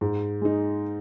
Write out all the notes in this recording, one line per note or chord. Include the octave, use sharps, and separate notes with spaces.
G#2
G#3 D#4